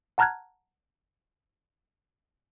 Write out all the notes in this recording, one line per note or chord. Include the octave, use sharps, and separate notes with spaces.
F#5 A5 A#5 F6 F#6 G#6